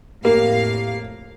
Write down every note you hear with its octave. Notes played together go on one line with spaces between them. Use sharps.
F2 A2 A#3 G4 F5